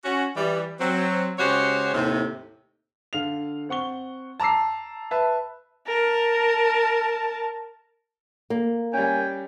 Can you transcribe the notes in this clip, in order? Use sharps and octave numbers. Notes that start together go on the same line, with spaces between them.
C#4 F#4
E3 G3
F#3 C4
C#3 G#3 F#4 G4 C5 C#5
D#2 A2 C3
D3 F5 F7
C4 F#5 C#6 G7
A5 A#5 D6 E6 C7
B4 E5 A5
A#4 A5
A#3
G3 C#4 G5 G#5